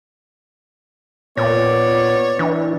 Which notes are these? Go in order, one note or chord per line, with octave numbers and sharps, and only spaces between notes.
A#2 B3 C#5 D5
E3 D4